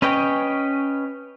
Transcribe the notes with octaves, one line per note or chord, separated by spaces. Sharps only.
C#4 B4 C#5 D#5 G5